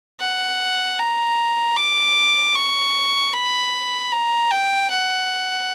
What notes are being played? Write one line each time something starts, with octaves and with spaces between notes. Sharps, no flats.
F#5
A#5
D6
C#6
B5
A#5
G5
F#5